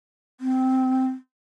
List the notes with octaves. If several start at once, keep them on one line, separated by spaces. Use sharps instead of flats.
C4